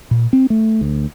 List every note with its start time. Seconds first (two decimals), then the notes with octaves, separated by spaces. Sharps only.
0.11 A#2
0.33 C4
0.50 A3
0.81 D2